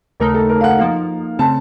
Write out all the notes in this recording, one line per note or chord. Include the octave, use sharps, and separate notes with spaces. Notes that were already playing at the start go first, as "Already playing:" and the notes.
D#2 C#3 A3 D#4 A#4
A4
A#4
F5
F#5
F3 A#3 D#4 F5
C#3 A3 C4 A5